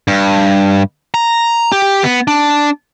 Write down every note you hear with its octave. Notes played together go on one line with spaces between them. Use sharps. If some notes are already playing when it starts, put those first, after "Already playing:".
G2
A#5
G4
B3
D4